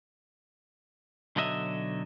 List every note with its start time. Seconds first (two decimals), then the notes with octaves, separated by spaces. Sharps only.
1.36 B1 D3 F#3 D#5 E5